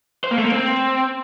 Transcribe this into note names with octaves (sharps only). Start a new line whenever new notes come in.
C5
A#3
A3
A#3
C4